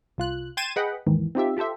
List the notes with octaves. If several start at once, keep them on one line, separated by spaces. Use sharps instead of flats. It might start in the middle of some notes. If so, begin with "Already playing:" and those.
C2 F4 F#6
G5 C6 G#6 A6 D#7 E7
G#4 B4 D#5 F#5 G5 B5
D#2 G#2 D#3 E3
C4 D#4 F4 G4 E5
F4 G4 A4 C5 E5